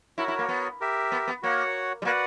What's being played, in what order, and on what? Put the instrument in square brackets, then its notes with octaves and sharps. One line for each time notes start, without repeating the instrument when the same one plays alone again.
[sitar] E4 [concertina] F#4 A#4 C#5
[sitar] E4
A#3
B3
[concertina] G4 A#4 E5
[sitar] B3
B3
[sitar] A#3 [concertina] F#4 C#5 F#5
[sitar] G3
[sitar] A#3 [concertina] F#4 B4 D5 F#5